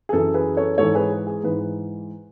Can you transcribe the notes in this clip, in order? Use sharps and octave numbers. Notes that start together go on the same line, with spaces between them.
G#4
F#2 E3 A4
G#4 B4
A4 C#5
G#2 E3 A4 C#5
G#4 B4
G#4
G#2 E3 B4